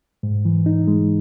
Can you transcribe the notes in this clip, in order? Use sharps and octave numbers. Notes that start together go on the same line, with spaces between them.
G#2
E3
D#4
G#3